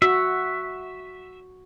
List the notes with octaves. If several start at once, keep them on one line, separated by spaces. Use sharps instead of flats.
F#4 E5